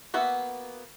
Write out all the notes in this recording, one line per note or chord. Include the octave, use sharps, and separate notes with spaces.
A#3 B3 F#4 E5 F#5